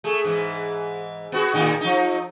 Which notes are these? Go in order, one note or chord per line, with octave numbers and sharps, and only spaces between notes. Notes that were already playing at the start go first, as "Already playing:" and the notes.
A3 G#4
G#2 E3
B3 F#4 G#4
A2 D#3 D#4
F3 D#4